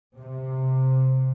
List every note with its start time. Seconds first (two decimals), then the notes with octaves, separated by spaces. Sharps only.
0.16 C3